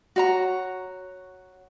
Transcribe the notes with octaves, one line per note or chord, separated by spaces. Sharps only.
F#4 C#5 A#5